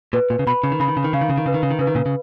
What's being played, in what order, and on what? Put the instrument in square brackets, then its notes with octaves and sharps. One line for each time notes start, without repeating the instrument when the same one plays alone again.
[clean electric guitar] A#2 [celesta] B4
[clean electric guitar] A#2
C#3
[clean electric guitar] B2 [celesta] B5
[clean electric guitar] C#3
D#3
[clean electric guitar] C#3 [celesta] B5
[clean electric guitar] D#3
C#3
D#3
[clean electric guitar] C#3 [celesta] F5
[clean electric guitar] D#3
C#3
D#3
[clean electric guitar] C#3 [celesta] B4
[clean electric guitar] D#3
C#3
D#3
[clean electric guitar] C#3 [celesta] B4
[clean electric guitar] D#3
A#2 C#3
C#3